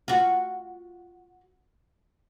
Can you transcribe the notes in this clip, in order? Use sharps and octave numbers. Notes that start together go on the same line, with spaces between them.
F4 F#4